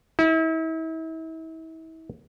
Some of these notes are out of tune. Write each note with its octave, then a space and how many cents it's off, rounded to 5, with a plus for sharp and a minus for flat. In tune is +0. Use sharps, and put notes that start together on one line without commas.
E4 -40